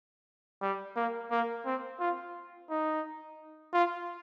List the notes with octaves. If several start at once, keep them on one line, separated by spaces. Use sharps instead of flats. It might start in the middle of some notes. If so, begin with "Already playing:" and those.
G3
A#3
A#3
C4
F4
D#4
F4